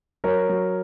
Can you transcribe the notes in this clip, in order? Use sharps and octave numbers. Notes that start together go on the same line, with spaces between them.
F#3 A#4 C#5
F#3